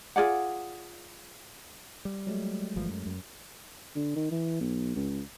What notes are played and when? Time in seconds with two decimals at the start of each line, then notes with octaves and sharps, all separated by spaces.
0.16 F4 G#4 D5 F#5
2.05 G3
2.27 F#3 G#3 A3
2.76 G1 E3 F3
2.90 F#2
3.06 F#2
3.95 D3
4.16 D#3
4.31 E3
4.60 B1
4.96 C#2